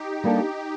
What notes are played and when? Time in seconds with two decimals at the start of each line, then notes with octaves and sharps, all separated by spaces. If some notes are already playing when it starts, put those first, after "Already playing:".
Already playing: D#4 G4
0.24 G3 A#3 D4 A4